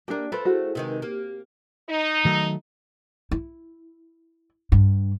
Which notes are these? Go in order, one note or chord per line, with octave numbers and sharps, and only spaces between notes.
A#3 D4 G4 A#4
A3 C4 F4 B4
E4 F#4 G#4 A4
C3 D#3 G#3 D#4 A#4 B4
A#3 G4
D#4
D#3 F#3 A3
E4
G2 D4